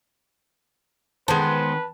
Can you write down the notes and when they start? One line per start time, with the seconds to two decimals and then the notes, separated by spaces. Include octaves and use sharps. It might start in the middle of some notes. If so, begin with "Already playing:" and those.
1.28 D#3 G#3 B3 B4 C5 A5